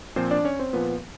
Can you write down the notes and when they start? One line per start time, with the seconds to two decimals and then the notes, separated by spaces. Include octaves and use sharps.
0.16 A#2 F3 C4 C5
0.31 D4 D5
0.45 C#4 C#5
0.59 C4 C5
0.73 A#2 F3 B3 B4